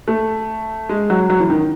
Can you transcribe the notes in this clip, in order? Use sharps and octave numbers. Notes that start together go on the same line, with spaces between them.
A3
G#3
F#3
F#3
E3
D#3